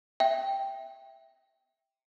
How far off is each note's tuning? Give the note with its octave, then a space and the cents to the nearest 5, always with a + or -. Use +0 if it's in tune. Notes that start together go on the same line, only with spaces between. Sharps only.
E5 +0 G5 +0